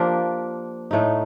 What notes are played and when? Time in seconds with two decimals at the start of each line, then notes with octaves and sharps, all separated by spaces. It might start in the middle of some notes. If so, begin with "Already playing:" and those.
Already playing: F3 A#3 D4 G4
0.91 A2 A3 D#4